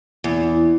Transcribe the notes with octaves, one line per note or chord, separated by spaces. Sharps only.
E2